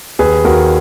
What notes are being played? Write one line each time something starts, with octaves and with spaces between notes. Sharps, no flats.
D#2 G#4 B4
D#2 F#4 A#4